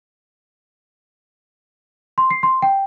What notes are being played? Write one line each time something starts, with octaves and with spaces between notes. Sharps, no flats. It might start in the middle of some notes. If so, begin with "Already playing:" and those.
C6
C7
C6
G5